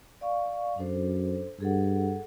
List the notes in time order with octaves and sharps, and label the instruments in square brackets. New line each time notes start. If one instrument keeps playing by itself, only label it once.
[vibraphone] D5 F5 C#6
[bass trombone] F#2 [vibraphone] D4 A4 C5
[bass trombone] G2 [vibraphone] G#4 A4 F#5